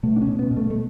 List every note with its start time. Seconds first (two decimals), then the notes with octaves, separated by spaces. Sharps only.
0.03 B2 A3
0.16 D4
0.22 C#4
0.27 B2
0.39 B3
0.51 B2
0.57 A3
0.70 A3